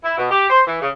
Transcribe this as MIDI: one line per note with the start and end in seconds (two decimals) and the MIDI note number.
0.03 0.13 64
0.18 0.28 47
0.31 0.46 67
0.50 0.61 72
0.66 0.80 52
0.82 0.89 49